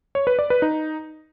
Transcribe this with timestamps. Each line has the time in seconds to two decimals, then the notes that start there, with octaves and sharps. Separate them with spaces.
0.15 C#5
0.27 B4
0.39 D5
0.50 B4
0.62 D#4